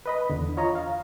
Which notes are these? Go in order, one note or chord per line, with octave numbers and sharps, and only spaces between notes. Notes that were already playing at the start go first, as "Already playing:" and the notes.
B4 D#5 B5
E2 D3
F4 C#5 D#5 A#5
F5